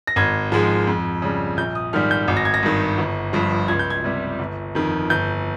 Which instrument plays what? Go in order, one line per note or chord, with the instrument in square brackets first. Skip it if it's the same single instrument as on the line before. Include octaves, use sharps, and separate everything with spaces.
[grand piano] A#6
G#1 G#6
G#2 F3 G#3
F2
C#3 G3
A#1 G6
D#6
G#2 D#3 G3 F6
G6
G#1
A#6
G#6
A#6
G2 D#3
G1
G2 F3
C#2 G#6
G6
G#6
C3 G3
G1
F2 D#3
G1 G6